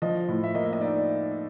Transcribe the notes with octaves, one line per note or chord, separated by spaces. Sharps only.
F3 D#5
A2
E5
A#3 D#5
E5
D#5
D#4 D5